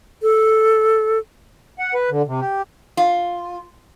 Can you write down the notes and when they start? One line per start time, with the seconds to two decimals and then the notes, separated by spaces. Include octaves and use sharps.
0.23 A4
1.79 F#5
1.94 B4
2.11 D3
2.27 C3
2.41 G4
2.97 F4